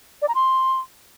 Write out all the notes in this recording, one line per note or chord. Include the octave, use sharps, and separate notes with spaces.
D5
A#5
C6